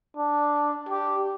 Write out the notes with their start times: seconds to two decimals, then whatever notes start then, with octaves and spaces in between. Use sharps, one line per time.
0.17 D4
0.89 G4